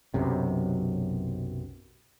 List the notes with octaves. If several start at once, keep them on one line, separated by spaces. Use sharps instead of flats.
B1 F#2 C3